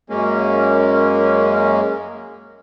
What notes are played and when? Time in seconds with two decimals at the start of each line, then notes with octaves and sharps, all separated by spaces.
0.10 F#2 G#3 A#3 C#4